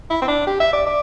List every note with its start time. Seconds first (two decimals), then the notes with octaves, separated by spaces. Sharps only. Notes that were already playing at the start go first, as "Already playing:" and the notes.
0.10 E4
0.22 C4
0.28 D4
0.47 G4
0.60 E5
0.73 D5
0.87 D5